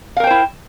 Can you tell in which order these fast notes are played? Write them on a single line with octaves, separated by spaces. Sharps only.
F5 A#4 G5 C5 E4